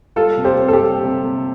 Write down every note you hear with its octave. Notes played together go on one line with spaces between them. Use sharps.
G3 F4 A4
C3
G4 C5
C4
A4
G4
G3
C3
C3